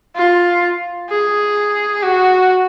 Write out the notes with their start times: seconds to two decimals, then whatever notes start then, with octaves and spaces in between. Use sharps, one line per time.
0.16 F4
1.10 G#4
2.03 F#4